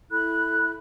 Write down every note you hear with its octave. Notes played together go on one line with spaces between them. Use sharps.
E4 A4 B5 F#6